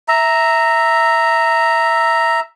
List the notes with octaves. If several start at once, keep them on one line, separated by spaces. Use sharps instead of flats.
E5 A#5